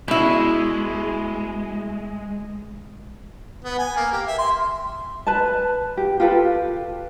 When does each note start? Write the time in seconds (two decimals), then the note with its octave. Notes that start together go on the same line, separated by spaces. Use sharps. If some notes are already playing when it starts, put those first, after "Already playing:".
0.08 B2 G#3 E4
3.64 B3
3.78 G#5
3.96 A#3
4.12 G4
4.26 E5
4.38 C6
5.27 B4 A5
5.97 G4
6.20 F4 G4 A4 B4